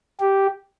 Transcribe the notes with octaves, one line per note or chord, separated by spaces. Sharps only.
G4